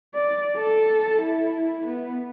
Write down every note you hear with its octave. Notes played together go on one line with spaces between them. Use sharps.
D5
A4
E4
B3